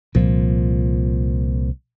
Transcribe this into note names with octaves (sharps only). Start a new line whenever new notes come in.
C2 A#2 F3